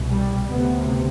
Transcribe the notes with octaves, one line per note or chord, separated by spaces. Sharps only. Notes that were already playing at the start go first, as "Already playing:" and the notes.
Already playing: C2 B2
G3
D2 C3 B3